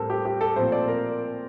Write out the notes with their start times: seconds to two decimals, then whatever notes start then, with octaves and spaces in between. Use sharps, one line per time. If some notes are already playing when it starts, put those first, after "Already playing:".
Already playing: A2 G3 C4 A4 A#4 C5
0.10 G4
0.25 G4
0.41 A4
0.56 A#2 F3 A3 C4 C5
0.72 D5
0.88 A#4